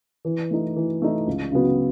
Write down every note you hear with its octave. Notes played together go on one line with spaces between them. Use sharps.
E3
A3 D#4
E3
A3 D#4
C#2
C#3 F#3 B3 F#4